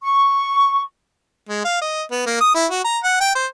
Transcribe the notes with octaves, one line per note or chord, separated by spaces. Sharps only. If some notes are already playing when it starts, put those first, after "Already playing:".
C#6
G#3
F5
D#5
B3
A#3
D#6
E4
F#4
A#5
F#5
G5
C5